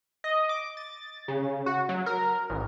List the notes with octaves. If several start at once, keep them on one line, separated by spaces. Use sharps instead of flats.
D#5
D6
A6
C#3
F#4
F#3
A#4
A1